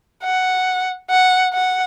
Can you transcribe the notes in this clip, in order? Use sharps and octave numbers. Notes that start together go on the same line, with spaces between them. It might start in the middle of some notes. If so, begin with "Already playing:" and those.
F#5
F#5
F#5